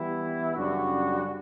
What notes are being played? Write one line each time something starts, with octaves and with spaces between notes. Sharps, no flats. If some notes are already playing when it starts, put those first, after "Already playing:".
Already playing: E3 G3 B3 E4
F#2 C#3 G3 D4 F#4